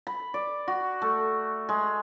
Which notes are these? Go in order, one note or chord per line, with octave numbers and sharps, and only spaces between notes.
B5
D5
F#4
A3
G#3